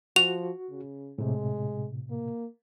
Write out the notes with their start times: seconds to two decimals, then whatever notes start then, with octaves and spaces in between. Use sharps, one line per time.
0.16 F3 F#4 F7
0.70 C#3
1.18 A2 C3 G#3
2.10 A#3